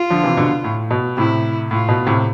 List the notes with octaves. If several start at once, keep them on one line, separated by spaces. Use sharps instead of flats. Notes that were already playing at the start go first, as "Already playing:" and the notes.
Already playing: F4
D3 F3
C3 E3
B2 D3
A2
B2
A2 C3 E4
A2 F4
B2
A2 C3